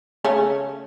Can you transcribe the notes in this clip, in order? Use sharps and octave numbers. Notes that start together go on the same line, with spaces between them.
C#3 A3 C#4